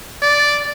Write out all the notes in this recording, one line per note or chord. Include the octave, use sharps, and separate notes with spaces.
D5